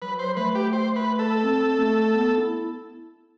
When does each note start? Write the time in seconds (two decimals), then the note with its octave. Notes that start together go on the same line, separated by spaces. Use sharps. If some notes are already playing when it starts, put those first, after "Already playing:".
0.01 F#3 B4
0.19 C5
0.37 A3 B4
0.55 G4
0.73 C5
0.96 B4
1.19 A4
1.44 C4
1.79 A3
2.14 B3
2.38 E4